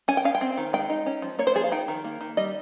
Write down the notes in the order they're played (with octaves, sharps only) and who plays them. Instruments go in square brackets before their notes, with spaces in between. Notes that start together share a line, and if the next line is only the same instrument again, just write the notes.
[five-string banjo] C#4 G#5
G5
C#4 F5
G5
C4
D#3
G#3 G5
D#4
C#4
F3
A#3 C#5
C5
F3 G#4
F5
D#4 G5
D#3
A#3
D#3
G3 D#5